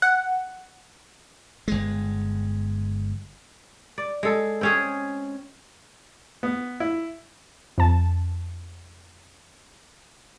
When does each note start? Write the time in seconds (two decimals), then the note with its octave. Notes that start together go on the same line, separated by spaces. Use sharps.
0.02 F#5
1.68 G1 G#3
3.98 D5
4.23 G#3 A4
4.61 C4 C#4 G#4
6.43 B3
6.80 E4
7.78 F2 A5